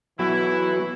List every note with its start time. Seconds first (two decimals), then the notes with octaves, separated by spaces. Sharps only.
0.19 E3 F#3 B3 E4 F#4